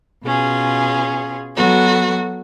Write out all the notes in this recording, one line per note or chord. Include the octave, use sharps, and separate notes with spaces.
B2 C#4 F4 G#4
F#3 B3 F#4 A4